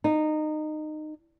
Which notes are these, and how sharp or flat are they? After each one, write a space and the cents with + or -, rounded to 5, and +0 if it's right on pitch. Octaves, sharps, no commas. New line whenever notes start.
D#4 -20